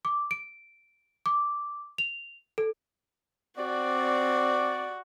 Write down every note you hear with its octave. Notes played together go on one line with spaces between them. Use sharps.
D6
D7
D6
F7
A4
C4 F#4 D5